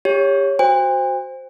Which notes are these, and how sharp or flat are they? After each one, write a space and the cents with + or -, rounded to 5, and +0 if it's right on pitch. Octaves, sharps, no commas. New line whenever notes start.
G4 +30 C#5 +0
F#4 +0 C5 +0 G5 +45